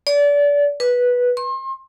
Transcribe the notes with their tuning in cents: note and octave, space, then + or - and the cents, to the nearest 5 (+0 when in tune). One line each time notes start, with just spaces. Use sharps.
D5 -30
B4 -10
C6 +35